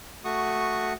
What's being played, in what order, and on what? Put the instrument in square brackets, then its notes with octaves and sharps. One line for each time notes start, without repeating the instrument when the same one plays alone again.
[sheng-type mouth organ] A3 F#4 C#6 D#6